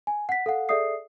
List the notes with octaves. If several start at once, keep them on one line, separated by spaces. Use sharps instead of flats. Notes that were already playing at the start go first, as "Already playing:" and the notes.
G#5
F#5 B6
A4 F5 F#5
G#4 A4 D5 E5 D#6 C7